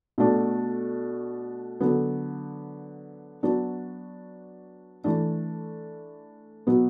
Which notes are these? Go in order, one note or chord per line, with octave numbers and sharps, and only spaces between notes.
B2 A3 D4
D3 F#3 B3
F#3 B3 D4 F#4
E3 A3 D4
B2 F#3 B3